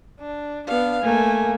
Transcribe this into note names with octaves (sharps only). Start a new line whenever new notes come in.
D4
B3 D4 F5
A3 A#3 G#5